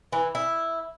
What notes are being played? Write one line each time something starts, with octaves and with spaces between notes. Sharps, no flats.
E3
E4